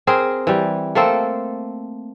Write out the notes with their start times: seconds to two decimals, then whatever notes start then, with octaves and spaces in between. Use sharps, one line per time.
0.07 C4 G#4 A#4
0.47 E3 G3
0.95 A3 A#3 C4 A4